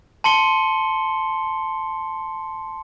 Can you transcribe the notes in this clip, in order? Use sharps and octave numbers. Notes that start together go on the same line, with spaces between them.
A5 C6 C#7 G7